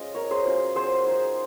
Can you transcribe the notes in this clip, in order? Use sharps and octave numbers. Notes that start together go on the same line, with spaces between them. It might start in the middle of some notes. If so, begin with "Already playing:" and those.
Already playing: G#3 C#4 F4 D#5
A#4 C#5
G#4 C5
F#3 C#4 F4
G#4 C5
G#3 D#4